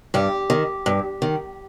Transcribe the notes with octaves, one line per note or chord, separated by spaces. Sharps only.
G2 G4
D#3
G2
D#3